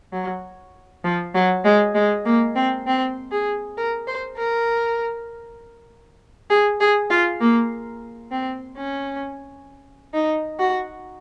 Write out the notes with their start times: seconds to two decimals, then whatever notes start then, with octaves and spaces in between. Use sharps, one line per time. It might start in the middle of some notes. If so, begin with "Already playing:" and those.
0.13 F#3
1.04 F3
1.35 F#3
1.65 G#3
1.95 G#3
2.26 A#3
2.56 C4
2.87 C4
3.32 G#4
3.77 A#4
4.07 C5
4.38 A#4
6.50 G#4
6.80 G#4
7.10 F4
7.41 A#3
8.32 C4
8.77 C#4
10.14 D#4
10.59 F#4